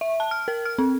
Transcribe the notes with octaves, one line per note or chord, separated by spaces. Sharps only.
E5
A5
F6
A#4
F6
C4